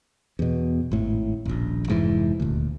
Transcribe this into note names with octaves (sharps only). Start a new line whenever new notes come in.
E2 B2
G#1 A2
D#1 A#1
F1 G#2 E3
D#1 D2